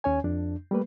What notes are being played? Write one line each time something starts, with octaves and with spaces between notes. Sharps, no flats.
D#2 C#4 C#5 G#5
F2 D4
G3 A3 A#3 B4